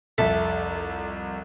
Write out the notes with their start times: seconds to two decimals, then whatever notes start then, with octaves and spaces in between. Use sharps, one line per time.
0.18 C2 F2 A4 E5